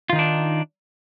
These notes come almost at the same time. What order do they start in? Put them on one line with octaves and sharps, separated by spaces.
F4 D#3 D#4 D4